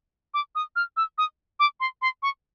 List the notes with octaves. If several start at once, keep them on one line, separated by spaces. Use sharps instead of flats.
D6
D#6
F6
E6
D#6
D6
C6
C6
C#6